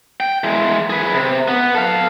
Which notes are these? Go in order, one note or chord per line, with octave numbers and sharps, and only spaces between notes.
G5
E3 G#3
G#4 B4
C3
B3
A4 F5